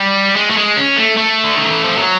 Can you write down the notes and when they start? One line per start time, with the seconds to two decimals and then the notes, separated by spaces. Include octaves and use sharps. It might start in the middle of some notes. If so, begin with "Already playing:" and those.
Already playing: G3
0.36 G#3
0.50 A3
0.57 G#3
0.77 C#4
0.97 A3
1.17 A3
1.44 D3
1.57 D#3
1.71 E3
1.84 F3
1.97 F#3